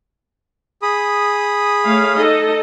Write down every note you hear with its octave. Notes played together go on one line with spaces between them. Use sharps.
G#4 B5 D#6
A3 C#5 F5
D#4 A4 D#5